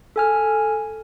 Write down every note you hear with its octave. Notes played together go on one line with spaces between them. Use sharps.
A4 G#5 F6